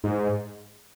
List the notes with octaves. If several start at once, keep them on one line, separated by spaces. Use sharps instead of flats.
G#2